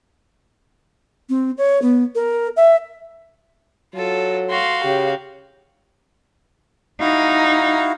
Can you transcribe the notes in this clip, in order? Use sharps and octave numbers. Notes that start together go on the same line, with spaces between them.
C4
C#5
B3
A#4
E5
F#3 F4 A4
F#4 F5 C6
C#3 G4
D#4 E4 F#4 F5